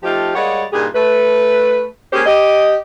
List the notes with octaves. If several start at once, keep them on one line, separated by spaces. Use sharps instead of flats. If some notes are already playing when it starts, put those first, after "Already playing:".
F3 A3 D#4 F4 G4
G3 G#3 A#3 C#5 D#5 F#5
G2 A#2 D#3 G4 G#4
A3 B4
G#3 A#3 C#4 G4 G#4 C5
G4 D#5